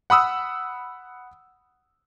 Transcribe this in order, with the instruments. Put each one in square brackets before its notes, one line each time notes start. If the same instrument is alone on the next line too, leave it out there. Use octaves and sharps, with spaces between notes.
[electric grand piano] F#5 B5 D#6 E6